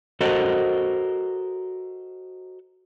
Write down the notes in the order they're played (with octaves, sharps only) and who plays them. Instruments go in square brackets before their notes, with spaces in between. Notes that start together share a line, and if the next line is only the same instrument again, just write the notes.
[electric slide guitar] F#4 A4 A#4 C5 D#5